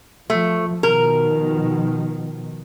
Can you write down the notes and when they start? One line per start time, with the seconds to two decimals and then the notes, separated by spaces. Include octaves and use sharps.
0.30 F3 A3
0.83 B2 D#3 F3 A#4